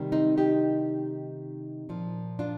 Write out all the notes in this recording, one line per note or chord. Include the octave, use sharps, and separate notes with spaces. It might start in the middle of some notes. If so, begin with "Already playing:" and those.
Already playing: C3 D#3 G3
C4 D#4
D#4 G4
A#2 F3
D4 F4